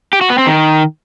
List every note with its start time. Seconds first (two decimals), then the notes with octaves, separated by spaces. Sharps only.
0.13 G4
0.21 F#4
0.30 B3
0.38 C4
0.47 D#3